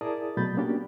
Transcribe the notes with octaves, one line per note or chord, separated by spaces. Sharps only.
E4 G#4 A#4 D5 A5 D#6
B2 F#3 A3 B5 G6 A6
A#3 B3 C#4 D4 F#4 G4